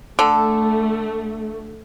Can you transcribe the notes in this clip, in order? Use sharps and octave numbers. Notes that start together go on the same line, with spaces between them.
D3 A3 A4